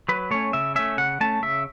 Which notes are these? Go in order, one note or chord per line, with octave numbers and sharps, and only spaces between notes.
F#3 B4
A3 C#4 C#5
C#3 E5
A3 C#4 E5
C#3 F#5
A3 C#4 A5
C#3 E5